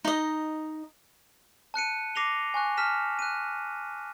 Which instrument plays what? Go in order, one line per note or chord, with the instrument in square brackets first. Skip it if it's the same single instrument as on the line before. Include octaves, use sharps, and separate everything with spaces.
[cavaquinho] D#4 D#5
[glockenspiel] A5 F#6 C#7 D#7
D6 A#6 C7 F7 G7
G#5 C#6 F#6
A5 F6 B6 E7
F#6 D#7